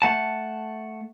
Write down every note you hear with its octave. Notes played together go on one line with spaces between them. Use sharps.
A3 F#5 A5